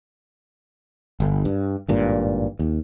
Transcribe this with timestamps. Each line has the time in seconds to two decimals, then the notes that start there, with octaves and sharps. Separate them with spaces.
1.20 G1
1.45 G2
1.88 G#1 G2 A#2
2.59 D#2